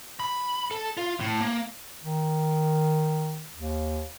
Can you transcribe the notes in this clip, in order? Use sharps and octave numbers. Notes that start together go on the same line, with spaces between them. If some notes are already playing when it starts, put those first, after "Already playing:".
B5
A4
F4
A2
A#3
D#3
D#2